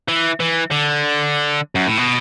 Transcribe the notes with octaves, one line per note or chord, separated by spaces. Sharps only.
E3
E3
D3
F#2
A2
B2